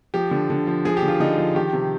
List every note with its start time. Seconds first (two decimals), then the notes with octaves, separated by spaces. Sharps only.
0.14 F3 G4
0.31 D3
0.50 D3
0.67 F3
0.85 F3 G#4
0.97 G4
1.02 D3
1.08 F4
1.20 D3 D#4
1.38 F3
1.55 D#3 G4
1.73 C3